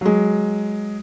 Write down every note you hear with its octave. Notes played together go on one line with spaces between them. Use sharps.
F#3 G#3